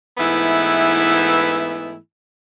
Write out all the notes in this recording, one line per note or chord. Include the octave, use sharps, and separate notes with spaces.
G#2 E3 A3 B3 E4